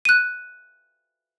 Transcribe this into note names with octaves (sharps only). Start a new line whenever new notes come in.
F#6 D#7